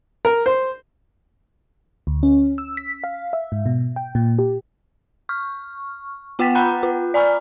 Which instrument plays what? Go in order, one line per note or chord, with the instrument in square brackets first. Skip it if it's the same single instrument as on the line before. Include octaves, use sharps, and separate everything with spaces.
[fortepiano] A#4
C5
[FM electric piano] D2
C#4
E6
B6
F5
E5
G#2
B2
G5
A#2
G4
[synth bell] C#6 F6
B3 F4 F#5 G5 A6 B6
F#5 G5 A#5 B5 F#6 G6
F4
D5 G#5 A#5 B5 C#6 F6